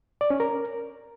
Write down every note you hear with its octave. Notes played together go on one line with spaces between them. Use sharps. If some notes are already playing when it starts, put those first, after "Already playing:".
D5
C#4
A#4